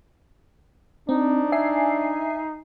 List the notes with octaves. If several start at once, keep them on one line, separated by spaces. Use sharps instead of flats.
C4 D4 D#4
D#4 E5 G#5 C7